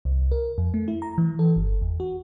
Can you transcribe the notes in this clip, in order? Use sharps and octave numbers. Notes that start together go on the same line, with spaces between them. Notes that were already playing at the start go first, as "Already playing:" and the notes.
C2
A#4
F2
A3
E4
A#5
E3
A4
G1
E2
F#4